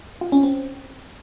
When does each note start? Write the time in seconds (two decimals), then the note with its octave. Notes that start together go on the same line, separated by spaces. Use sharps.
0.21 F4
0.32 C#4
0.43 C4